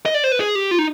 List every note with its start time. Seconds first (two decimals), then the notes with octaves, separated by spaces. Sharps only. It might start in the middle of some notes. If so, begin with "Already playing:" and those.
0.06 D#5
0.14 D5
0.24 C5
0.32 B4
0.40 G#4
0.55 G4
0.71 F4
0.79 D#4